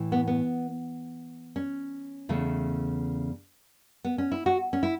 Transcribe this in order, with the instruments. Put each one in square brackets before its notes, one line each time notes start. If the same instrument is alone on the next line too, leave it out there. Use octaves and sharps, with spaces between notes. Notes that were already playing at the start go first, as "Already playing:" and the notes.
Already playing: [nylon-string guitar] A2 E3
B3
B3
C#4
E2 C#3 A3
B3
C#4
E4
F#4
C#4
E4